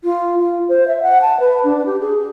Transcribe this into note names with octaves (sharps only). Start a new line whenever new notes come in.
F4
F4
C5
E5
F#5
A5
B4
D4
G4
G#4